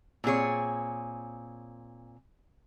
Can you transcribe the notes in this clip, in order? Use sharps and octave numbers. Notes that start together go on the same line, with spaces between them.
A#2 C4 G#4 C#5